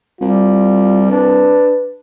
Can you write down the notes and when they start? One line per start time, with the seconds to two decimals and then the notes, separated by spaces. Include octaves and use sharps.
0.21 C2 G3 F4
1.11 D4 B4